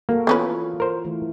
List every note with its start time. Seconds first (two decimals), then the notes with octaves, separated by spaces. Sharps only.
0.09 A#3 F#4 A4 A#4
0.27 E3 B3 C#4 F4 B4
0.80 A#4 C5
1.05 E3 A3